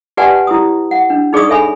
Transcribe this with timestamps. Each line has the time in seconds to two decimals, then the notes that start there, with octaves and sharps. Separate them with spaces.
0.17 G4 B4 D5 F#5 G#5 A5
0.47 E4 G4 D#6
0.91 F#5
1.10 D4
1.33 D#4 G#4 D5 C#6 D#6
1.49 A4 C#5 E5 G#5 B5